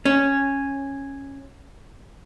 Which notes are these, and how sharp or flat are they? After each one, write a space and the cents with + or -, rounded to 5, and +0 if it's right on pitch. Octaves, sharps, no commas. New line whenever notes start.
C#4 -10